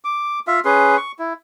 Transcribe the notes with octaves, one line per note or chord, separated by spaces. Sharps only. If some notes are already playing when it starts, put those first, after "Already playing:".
D6
F4 E5 F5
C#4 G#4 B4 C6
C#6
E4